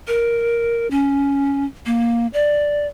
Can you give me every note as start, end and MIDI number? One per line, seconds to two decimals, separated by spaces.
0.07 0.89 70
0.91 1.65 61
1.86 2.27 58
2.33 2.87 74